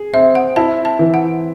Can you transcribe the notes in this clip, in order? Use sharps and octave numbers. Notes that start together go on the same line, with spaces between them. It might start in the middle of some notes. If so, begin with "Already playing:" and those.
Already playing: G#4
C4 E5
F#5
E4 A5
A5
E3
F#5